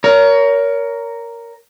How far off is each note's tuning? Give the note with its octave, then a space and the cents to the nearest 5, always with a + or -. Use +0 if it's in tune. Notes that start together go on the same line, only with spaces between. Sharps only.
A#4 +0 C#5 +30